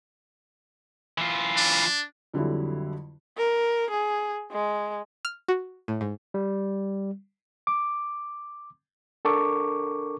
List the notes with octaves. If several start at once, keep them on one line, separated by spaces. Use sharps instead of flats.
E3 F4
D4
F2 D3 F#3 G3 E4
A#4
G#4
G#3
F6
F#4
A2
G#2
G3
D6
D4 A4 A#4 C#6 D6